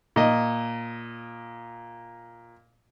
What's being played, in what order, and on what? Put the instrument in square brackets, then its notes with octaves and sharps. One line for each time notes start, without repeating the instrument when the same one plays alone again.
[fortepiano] A#2 D#5